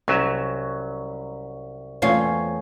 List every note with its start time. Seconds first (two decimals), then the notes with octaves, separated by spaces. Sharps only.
0.08 C2 F#3 C#4 E5
2.02 E2 A3 C4 C#4 F4 C#5